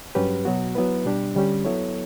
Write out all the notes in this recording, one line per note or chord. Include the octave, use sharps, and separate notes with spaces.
G2 F#3 C#4 G4 B4
B2 F#3 B3 F#4
F#3 B3 E4 B4
B2 G3 D4 G4
D3 G3 C#4 G4
F#3 B3 E4 A4 C#5